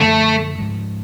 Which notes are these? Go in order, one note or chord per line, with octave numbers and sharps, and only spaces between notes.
F#2 D3 F3 A3
G#2 F3 G#3